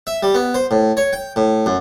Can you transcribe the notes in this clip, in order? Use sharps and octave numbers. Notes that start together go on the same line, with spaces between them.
E5
G3
B3
C5
A2
C#5
G5
A2
F#2